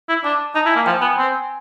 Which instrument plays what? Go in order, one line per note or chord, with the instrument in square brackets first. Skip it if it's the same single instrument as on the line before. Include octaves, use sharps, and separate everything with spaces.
[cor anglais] E4
[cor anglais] D4 [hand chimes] A5
[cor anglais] D#4 [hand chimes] A5
[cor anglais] E4 [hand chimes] A5
[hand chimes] G#5
[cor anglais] A#3
[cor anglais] F3 [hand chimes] G5
[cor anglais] B3 [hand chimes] G#5
[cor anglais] C4